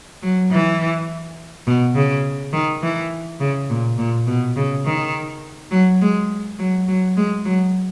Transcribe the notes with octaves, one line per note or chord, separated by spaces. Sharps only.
F#3
E3
B2
C#3
D#3
E3
C#3
A#2
A#2
B2
C#3
D#3
F#3
G#3
F#3
F#3
G#3
F#3